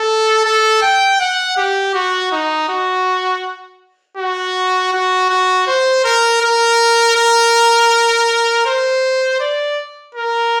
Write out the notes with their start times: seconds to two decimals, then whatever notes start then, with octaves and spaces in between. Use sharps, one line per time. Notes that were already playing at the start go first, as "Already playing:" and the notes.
Already playing: A4
0.45 A4
0.82 G5
1.20 F#5
1.57 G4
1.94 F#4
2.32 D#4
2.69 F#4
4.18 F#4
4.93 F#4
5.30 F#4
5.67 C5
6.04 A#4
6.42 A#4
7.16 A#4
8.66 C5
9.40 D5
10.15 A#4